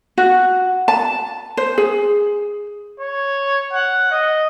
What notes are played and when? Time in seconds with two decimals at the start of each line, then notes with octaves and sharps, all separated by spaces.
0.18 F#4
0.88 A5
1.57 C5
1.78 G#4
3.00 C#5
3.73 F#5
4.11 D#5